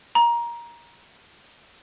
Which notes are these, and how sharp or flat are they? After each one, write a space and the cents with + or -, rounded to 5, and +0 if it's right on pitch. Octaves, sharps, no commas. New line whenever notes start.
A#5 +20